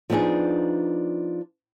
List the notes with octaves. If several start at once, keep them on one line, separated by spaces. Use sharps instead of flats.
F3 B3 D4 D#4 G#4